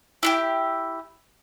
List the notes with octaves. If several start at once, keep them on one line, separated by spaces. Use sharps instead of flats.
E4 F4 G4